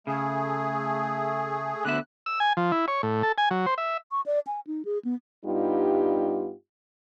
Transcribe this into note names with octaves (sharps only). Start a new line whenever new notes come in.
C#3 A3 G#4
D2 D3 B3 E5 F#6
E6
G#5
F3
E4
C#5
A2
A4
G#5
F#3
C5
E5
C#6
D5
G#5
D#4
G#4
B3
G2 G3 B3 D#4 F4 G4